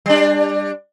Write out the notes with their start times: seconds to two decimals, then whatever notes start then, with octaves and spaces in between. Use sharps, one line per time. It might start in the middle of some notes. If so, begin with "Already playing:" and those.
0.06 G3 D4